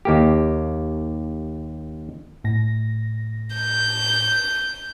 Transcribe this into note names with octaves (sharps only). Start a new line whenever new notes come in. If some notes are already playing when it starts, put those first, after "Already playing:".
D#2 A#3 G4
A2 A#6
G6